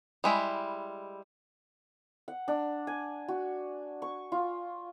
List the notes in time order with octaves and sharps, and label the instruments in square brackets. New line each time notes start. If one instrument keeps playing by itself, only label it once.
[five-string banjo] G3 G#3 E4
[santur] F#5
D4
G#5
F#4
C#6
F4